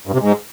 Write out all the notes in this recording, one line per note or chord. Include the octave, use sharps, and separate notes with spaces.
G2
C3
G#2